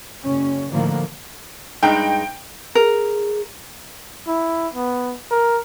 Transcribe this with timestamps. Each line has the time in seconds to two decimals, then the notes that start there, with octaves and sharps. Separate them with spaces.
0.23 F#1 C#4
0.72 A2 D3 D#3 F3 A#3
1.83 G2 G#3 D#4 G5
2.75 G#4 A#4
4.27 E4
4.74 B3
5.31 A#4